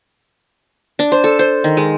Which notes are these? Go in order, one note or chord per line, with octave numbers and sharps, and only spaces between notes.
D4
C5
A4
C5
D#3
G#3